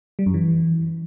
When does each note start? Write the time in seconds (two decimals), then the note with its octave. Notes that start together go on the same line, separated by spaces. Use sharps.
0.19 G3
0.26 F#2
0.34 E3